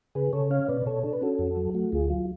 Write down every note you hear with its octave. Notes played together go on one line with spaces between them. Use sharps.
C#3 G#4 B4
C#3 A4 C#5
C#4 C#5 F5
B2 B4 D5
B2 A4 C#5
D4 A4
B4
C#4 F#4 A4
F2
F#3
A3 F#4
D2 F4 G#4
F#3 F4